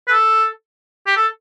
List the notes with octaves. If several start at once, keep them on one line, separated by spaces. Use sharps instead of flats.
B4
A4
G4
A4